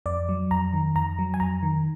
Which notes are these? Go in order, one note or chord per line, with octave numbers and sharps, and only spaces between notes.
F2 D5
F#3
F2 A#5
D#3
F2 A#5
F#3
G#5
F2 A#5
D#3